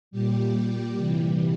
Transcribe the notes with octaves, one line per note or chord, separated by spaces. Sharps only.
A#2 G3 G4
C3 E3 G3